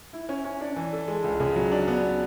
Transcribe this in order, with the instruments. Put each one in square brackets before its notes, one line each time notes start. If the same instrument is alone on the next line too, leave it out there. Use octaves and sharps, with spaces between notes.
[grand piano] E4
C#4
C#4
D4
E3
A4
G#3
C#2
C#3
F#3
D4
B3